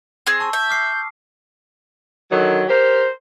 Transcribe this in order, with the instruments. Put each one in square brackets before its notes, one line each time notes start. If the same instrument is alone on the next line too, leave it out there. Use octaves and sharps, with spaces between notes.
[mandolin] C4 G#4
[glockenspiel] A5 C#6 E6
[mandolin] E5 [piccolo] G6
[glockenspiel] D6 F6 C7
[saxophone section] D3 D#3 F#3
G4 A#4 C5